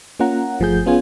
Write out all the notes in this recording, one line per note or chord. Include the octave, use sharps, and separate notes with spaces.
A#3 C#4 F4 F#5 A#5
G1 F3 A3 G#4 G6
B3 C#4 F4 G#4 G#5